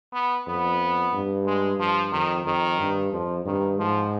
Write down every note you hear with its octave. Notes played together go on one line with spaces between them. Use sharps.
B3
F2 B3
G2
G#3
G2 F3
F2 D#3
F2 D#3
G2
F2 F3
G2 D#3
G#2 F3